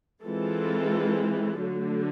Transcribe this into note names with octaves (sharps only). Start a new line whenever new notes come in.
E3 G#3 C4 F4 A4
D3 F#3 A3